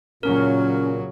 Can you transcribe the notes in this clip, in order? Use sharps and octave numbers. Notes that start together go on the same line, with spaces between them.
A#2 C#3 F#3 C#4 A#4